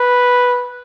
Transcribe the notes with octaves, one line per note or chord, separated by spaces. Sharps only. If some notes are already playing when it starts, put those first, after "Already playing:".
Already playing: B4